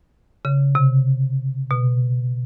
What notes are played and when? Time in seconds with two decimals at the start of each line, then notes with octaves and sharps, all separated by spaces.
0.45 C#3
0.75 C3
1.71 B2